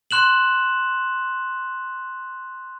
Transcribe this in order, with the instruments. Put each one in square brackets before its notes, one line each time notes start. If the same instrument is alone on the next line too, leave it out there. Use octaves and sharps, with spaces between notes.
[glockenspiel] C6 F#6 E7 F#7